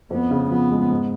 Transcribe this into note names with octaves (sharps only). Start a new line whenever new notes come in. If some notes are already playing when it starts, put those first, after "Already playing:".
F2 B3
C#3
F3 B3
G#3
G#2